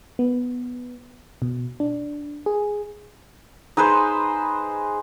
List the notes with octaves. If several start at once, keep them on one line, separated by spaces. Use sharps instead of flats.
B3
B2
D4
G#4
D#4 G#4 B4 C5